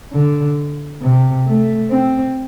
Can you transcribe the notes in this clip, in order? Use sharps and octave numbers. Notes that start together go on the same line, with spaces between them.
D3
C3
A3
C4